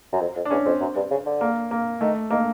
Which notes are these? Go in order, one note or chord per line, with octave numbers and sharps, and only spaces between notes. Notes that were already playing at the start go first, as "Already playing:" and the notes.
F#2
F2
F2
D4
E2 C#4
F2 C4
F#2
G2
C#3
D3
A#3
A#3
D#3 A3
D#3 A#3